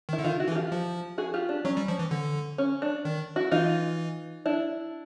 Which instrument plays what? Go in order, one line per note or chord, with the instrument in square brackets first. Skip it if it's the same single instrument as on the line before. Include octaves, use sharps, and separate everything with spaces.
[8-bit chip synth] D#3
[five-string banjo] E4
[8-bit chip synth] D3
[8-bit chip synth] D#3 [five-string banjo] D#4 F4
[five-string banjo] E4 F#4
[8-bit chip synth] E3
[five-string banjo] G#4
F4 G4
[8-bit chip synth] F3
[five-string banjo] F#4 G#4
F4 G4
D4
[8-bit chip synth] F#3 [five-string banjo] C#4
[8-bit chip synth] G3
F3
E3
D3
[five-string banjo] C#4
D4
[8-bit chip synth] D#3
[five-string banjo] E4 F#4
[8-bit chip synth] E3 [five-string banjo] D#4 F4
[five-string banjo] D4 E4